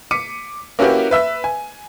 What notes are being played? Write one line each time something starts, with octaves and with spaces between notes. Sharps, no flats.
D6 B6 C#7 D#7
A#3 C#4 E4 F#4 G4 B4
B4 E5 E6
G#5